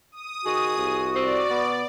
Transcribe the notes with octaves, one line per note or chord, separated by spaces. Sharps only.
D#6
D#3 F#4 G#4
C2
C4 D5
B2 B3